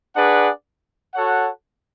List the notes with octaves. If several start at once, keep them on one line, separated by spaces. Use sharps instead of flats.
D4 G#4 B4 D5 F#5
F#4 A4 C#5 F#5